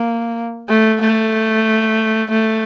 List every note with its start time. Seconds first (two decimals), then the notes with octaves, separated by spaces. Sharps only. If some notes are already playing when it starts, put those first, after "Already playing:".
Already playing: A#3
0.69 A3
1.01 A3
2.30 A3